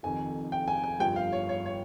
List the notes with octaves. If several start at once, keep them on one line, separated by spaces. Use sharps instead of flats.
F1 F2 D#3 G#5
G5
G#5
G#5
G1 G2 F3 G5
F5
C#5
C#5
C#5